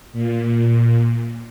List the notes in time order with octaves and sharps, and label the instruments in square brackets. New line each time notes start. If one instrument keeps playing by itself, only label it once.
[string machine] A#2